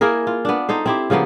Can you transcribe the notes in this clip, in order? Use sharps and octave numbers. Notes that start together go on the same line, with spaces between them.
A#3 E4 G#4 A#4
F4
B3 D4
D#4 A4 C5
C4 E4 G4
C#3 F3 A#3 B3